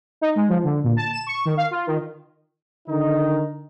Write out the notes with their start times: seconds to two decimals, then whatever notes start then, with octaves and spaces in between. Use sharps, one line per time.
0.21 D#4
0.36 G#3
0.49 F3
0.64 D3
0.84 A#2
0.96 A5
1.12 E7
1.27 C#6
1.45 D#3
1.57 F5
1.71 F4
1.87 D#3
2.88 D3 D#3 D#4